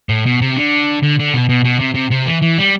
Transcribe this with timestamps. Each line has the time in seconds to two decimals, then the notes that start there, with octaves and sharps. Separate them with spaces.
0.09 A2
0.26 B2
0.41 C3
0.56 D3
1.02 D3
1.19 D3
1.33 B2
1.49 B2
1.65 B2
1.81 C3
1.95 C3
2.12 C3
2.27 E3
2.42 E3
2.58 G3